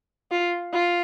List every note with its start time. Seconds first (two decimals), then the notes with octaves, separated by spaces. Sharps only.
0.31 F4
0.73 F4